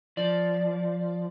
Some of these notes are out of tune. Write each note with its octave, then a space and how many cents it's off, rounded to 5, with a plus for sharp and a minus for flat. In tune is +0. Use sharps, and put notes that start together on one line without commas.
F3 +0 D5 +0